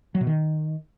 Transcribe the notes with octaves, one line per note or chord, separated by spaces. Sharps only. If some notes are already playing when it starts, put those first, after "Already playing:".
F#3
B2
D#3